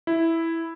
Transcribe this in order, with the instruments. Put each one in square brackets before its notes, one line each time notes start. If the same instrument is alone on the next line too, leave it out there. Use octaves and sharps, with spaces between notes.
[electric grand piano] E4